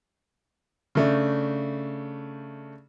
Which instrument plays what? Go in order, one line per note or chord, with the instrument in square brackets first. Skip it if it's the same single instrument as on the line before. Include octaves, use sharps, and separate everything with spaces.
[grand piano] C#3 A3 D4